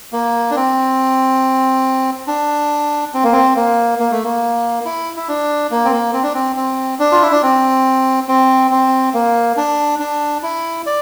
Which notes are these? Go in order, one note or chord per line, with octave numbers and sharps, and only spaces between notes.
A#3
D4
C4
D4
C4
A#3
C4
A#3
A#3
A3
A#3
E4
E4
D4
A#3
C4
A#3
C4
D4
C4
C4
D4
F4
E4
D4
C4
C4
C4
A#3
D4
D4
E4
D5